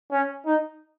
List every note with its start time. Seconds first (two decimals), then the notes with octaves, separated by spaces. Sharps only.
0.11 C#4
0.46 D#4